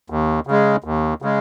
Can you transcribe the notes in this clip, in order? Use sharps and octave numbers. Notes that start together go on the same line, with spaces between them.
D#2
C#3 G#3
D#2
C#3 G#3